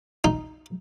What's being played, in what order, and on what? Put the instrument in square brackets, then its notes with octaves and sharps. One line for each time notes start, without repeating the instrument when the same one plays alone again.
[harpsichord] D#4